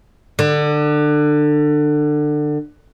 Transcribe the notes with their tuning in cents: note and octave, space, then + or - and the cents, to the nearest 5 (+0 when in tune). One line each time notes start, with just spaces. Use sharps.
D3 +25